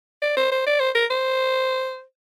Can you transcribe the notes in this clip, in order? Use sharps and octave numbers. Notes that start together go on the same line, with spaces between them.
D5
C5
C5
D5
C5
A#4
C5